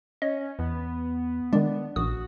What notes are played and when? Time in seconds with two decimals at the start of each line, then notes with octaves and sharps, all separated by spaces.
0.22 C#4 D#5
0.59 E2 B3
1.53 D#3 G#3 D4
1.96 A#1 F#4 D#6